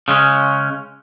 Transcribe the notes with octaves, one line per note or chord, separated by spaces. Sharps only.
C#3 G#3 C#4